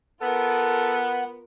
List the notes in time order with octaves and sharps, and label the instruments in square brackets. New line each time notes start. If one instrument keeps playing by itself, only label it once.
[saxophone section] B3 [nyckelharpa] F4 A#4 [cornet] A4 [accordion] F#5